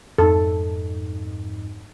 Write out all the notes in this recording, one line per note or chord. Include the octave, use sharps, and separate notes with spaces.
F2 G#2 D#4 A4